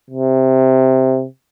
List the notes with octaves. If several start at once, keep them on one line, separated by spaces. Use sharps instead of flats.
C3